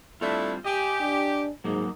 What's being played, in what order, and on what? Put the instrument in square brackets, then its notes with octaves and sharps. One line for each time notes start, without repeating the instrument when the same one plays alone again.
[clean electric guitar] G3 C4 F4 [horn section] A3 D4 E4
[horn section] G4 [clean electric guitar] D#5 G#5
[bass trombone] D4
[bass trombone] G#2 [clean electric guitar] F#3 A#3 D#4